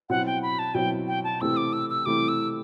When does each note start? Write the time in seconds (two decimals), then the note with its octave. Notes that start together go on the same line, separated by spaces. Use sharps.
0.10 B2 F#3 C4 E4 F#5
0.26 G5
0.42 B5
0.59 A5
0.75 B2 F#3 C4 E4 G5
1.07 G5
1.24 A5
1.41 C3 E3 A3 C4 E4 E6
1.57 D6
1.73 E6
1.90 E6
2.06 C3 E3 A3 C4 E4 D6
2.28 E6